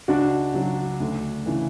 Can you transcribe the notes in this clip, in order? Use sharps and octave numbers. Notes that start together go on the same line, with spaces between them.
C#2 D4 F#4
C#3 F#3
D2
C#3 E3